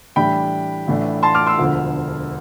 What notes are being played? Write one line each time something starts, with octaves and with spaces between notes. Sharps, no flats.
A2 E3 G3 D4 G5 B5
A1 A2 E3 A3 D4
A5 C6
D6 F6
C6 E6
E1 D2 D3 F3